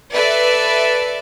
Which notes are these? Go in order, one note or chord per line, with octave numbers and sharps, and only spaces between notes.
A4 B4 D5 E5